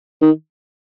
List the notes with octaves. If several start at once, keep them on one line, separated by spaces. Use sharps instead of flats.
D#3